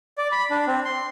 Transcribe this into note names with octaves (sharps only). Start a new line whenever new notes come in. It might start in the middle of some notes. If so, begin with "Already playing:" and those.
D5
B5
D4
C4
C6